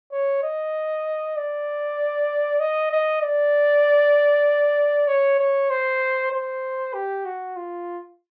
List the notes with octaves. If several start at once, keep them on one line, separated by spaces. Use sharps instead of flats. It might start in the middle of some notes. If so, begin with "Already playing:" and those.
C#5
D#5
D5
D#5
D#5
D5
C#5
C#5
C5
C5
G4
F#4
F4